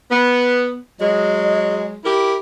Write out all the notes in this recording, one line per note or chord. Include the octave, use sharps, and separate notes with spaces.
B3
F#3 G#3 D#5
E4 G4 A#4